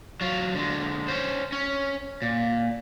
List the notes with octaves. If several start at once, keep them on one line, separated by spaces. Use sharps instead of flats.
F#3 F4
D3 G#3
C#4 C5
C#4
A#2